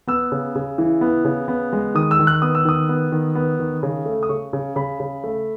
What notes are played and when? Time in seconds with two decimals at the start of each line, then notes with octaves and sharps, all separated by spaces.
0.07 B3 E6
0.32 C#3
0.55 C#3
0.78 E3
1.01 B3
1.25 C#3
1.48 B3
1.73 G#3
1.95 D#3 D#6
2.11 E6
2.19 D#3
2.27 F#6
2.42 B3 D#6
2.55 E6
2.65 D#3 D#6
2.89 B3
3.12 D#3
3.35 B3
3.60 D#3
3.83 C#3
4.06 A3
4.23 D#6
4.29 C#3 C#6
4.53 C#3
4.76 C#3 B5
5.00 C#3
5.24 A3